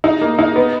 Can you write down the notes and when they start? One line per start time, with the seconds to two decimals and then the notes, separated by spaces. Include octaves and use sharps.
0.04 D#4
0.21 A#3
0.39 D#4
0.56 B3